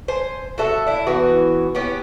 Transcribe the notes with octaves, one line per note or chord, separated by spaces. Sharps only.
C5 G#5
F#4 A4 E5
D4 E4
E3 B3 F#4
B3 C#4 G4